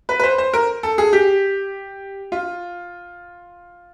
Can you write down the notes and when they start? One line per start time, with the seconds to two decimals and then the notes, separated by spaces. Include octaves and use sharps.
0.09 B4
0.19 B4
0.23 C5
0.38 C5
0.53 A#4
0.83 A4
0.98 G#4
1.13 G4
2.32 F4